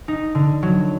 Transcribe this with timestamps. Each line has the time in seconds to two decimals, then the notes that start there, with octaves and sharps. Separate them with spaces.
0.08 D#4
0.35 D3
0.63 F#3